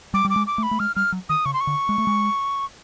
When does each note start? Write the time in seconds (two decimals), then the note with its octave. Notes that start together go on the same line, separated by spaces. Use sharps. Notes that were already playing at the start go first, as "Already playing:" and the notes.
0.14 G3 D6
0.25 G3
0.30 D6
0.36 G#3
0.47 D6
0.58 A3
0.63 B5
0.71 A3
0.79 G#3 F6
0.96 G3 F6
1.12 F#3
1.29 D#3 D#6
1.45 C#3 C#6
1.54 C6
1.61 C#6
1.67 D3
1.89 G#3
1.98 A3
2.07 G#3